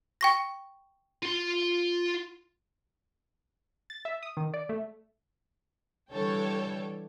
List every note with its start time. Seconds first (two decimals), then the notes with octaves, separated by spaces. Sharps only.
0.21 G5 C#6 A#6
1.23 F4 C6
3.90 A6
4.05 E5
4.23 D#6
4.37 D#3
4.54 D5
4.69 A3
6.11 D3 E3 G3 A4 C#5 G5